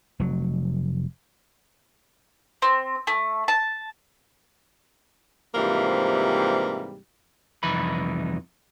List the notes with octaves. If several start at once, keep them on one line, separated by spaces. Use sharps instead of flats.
F1 F#3
C4
A3
A5
G#2 C3 E3 F3 G3 A#3
C2 F2 E3 D#4 B5